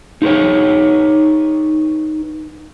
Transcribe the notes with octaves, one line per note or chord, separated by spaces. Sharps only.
D#4 G#4 B4 C#5